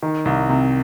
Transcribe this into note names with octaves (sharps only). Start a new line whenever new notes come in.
D#3
C2
C3